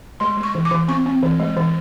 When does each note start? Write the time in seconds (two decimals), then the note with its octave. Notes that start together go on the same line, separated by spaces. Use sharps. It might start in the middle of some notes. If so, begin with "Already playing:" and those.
0.20 G#3 C6
0.37 G#3
0.43 C#6
0.55 E3
0.65 D6
0.71 E3
0.88 C4 C#6
1.06 C4
1.23 E3
1.40 G#3
1.57 E3